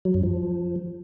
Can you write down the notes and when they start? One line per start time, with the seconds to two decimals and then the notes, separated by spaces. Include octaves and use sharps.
0.05 F#3
0.14 F#2
0.23 F3